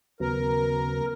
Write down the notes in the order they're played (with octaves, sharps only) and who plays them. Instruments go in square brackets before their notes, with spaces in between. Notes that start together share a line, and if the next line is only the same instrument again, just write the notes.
[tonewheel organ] D#2 C#3 F#3 B3 [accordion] A#4